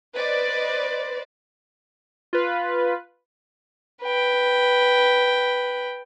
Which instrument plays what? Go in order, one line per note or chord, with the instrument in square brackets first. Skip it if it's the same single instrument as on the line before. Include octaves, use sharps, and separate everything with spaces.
[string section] B4 C5 D5 D#5
[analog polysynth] F4 B4
[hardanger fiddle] B4 G5